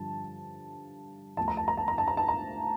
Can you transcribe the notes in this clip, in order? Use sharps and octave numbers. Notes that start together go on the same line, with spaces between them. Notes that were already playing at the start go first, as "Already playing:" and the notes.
Already playing: G2 D3 F3 A5
D2 D3 F3 A5
A#5
A5
A#5
A5
A#5
A5
A#5
A5
A#5